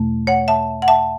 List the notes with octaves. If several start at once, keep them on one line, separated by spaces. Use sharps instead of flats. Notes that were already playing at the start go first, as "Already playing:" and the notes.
Already playing: E2 B2 A3
C#5 F#5
E5 A5
F#5
E5 A5